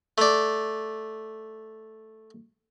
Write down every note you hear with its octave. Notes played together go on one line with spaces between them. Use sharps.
A3 D5